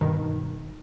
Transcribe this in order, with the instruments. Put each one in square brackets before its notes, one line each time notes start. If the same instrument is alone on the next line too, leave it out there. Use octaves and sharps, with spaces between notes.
[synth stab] G2 B2 D#3